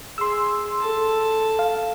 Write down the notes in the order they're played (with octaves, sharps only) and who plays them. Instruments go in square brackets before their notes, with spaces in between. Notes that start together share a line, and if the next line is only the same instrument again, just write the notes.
[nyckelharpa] G#4 [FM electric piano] C6 E6
[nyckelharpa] A4 A5
[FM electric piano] F5